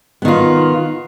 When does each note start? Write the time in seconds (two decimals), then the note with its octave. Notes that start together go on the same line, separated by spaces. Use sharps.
0.22 B3
0.25 D#3
0.28 F4